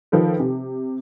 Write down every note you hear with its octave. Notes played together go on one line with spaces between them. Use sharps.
D#3 F3 A4 B4
C3